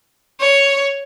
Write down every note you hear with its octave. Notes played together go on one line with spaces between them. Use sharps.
C#5